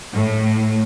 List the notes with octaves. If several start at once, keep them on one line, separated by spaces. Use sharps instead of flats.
A2